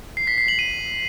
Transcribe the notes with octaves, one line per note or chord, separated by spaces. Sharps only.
C7
B6
C7
F#7
D#7